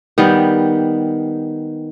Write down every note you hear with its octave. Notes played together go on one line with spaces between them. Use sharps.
D#3 G3 B3